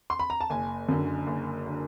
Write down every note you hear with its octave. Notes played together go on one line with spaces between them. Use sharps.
C6
B5
A#5
A5
F#1 G#5
F#2 D3
F#1
D3